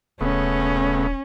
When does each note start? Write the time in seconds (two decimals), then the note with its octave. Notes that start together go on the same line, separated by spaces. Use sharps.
0.21 D#1 C#3 A3 B3 C#4